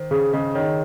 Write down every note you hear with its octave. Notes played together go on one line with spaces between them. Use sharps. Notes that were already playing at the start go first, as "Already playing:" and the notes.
Already playing: D#3 C5
C#3 G#4
C#3 D#5
D#3 C#5